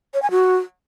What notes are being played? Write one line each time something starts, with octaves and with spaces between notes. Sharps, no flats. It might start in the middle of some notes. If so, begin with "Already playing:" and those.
C#5
G#5
F#4